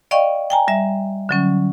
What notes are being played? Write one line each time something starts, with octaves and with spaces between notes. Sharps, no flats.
D5 D#5 F5 G5 C#6
G5 G#5 A#5
G3 E5
D3 F#3 C#4